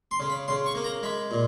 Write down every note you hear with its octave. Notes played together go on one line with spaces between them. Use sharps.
C6
C#3
B5
C#3 C6
C#6
A#3
A#5
G#3 B5
A#2